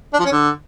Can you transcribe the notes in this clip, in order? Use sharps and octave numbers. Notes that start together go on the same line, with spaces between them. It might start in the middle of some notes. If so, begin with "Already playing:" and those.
D4
F3
C#4
D3